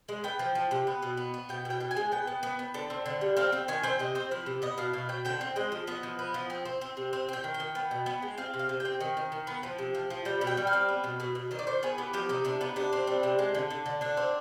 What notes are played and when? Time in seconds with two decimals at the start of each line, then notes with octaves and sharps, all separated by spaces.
0.09 G#3
0.24 B3 G5
0.39 F3
0.55 F3
0.71 C3
0.87 B3
1.02 B2
1.17 B3
1.34 B3
1.49 B2 G5
1.65 B2
1.70 G5
1.80 B2
1.91 G#5
1.97 G#3
2.12 B3 G5
2.27 B3
2.43 B3
2.59 B3
2.74 D3
2.90 C4
3.06 D3
3.21 G3
3.37 C4 F5
3.52 C4 G5
3.68 D#3 G#5
3.84 C4 G5
3.99 C3 D#5
4.15 C4 C5
4.31 F3 B4
4.46 C3
4.62 B3 D#5
4.78 B2 F5
4.93 B2 F5
5.09 B2 G5
5.25 D3 G5
5.41 C4
5.56 G#3 D#5
5.72 F3
5.87 B3 D#5
6.03 F3
6.19 B3
6.34 F3
6.50 C4
6.65 C4
6.81 C4
6.97 C3
7.13 C4
7.29 C4 G5
7.44 D#3
7.54 G5
7.60 D#3
7.75 B3
7.91 B2
8.06 B3
8.22 G#3
8.38 C4 F5
8.54 C3
8.59 F5
8.69 C3
8.80 G5
8.85 C4
9.00 D#3
9.17 D#3
9.32 D#3
9.47 B3
9.63 F3
9.78 C3
9.95 F3
10.10 F3
10.25 G3 G5
10.41 B2
10.47 G5
10.57 G3
10.67 F5
10.73 C4
10.88 B3
11.04 B2
11.20 B2
11.35 B2
11.51 D#3 D#5
11.59 D5
11.67 D#3 C5
11.83 B3 G#4
11.98 B3 G4
12.13 F3 G4
12.29 C3 D#4
12.45 C3 D4
12.61 B3 D#4
12.76 C3 D4
12.93 C4
13.07 G3
13.23 C3
13.39 G#3
13.55 D3
13.71 D3
13.86 D3
14.01 D3 D4
14.17 C4